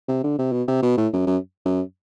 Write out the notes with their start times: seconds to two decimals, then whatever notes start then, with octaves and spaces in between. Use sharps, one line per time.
0.08 C3
0.23 D3
0.38 C3
0.52 B2
0.68 C3
0.83 B2
0.97 A2
1.13 F#2
1.27 F#2
1.65 F#2